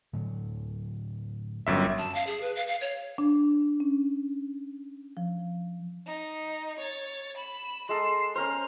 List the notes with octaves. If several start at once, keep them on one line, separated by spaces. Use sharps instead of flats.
A2 D3 F#3
G1 F#2 E5
A5
F5
G#4
B4
F5
F5
C#5
D4
C#4
F3
D#4
C#5 A6
B5 E7
G#3 A4 C7 E7
C#4 A#4 C5 F6